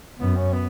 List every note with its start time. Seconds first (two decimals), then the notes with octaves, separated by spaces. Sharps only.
0.19 F#2 B3
0.36 C#4
0.53 B3